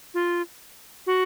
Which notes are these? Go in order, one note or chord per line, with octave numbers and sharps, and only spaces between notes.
F4
F#4